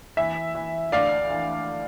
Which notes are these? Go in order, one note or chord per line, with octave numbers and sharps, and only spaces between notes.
E3 E5
E3
D2 D5 F5
E3